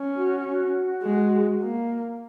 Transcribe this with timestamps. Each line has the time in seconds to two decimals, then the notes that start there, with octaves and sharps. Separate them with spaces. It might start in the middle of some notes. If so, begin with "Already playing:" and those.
Already playing: C#4
0.16 F#4
0.45 F#4
1.03 G#3
1.61 A#3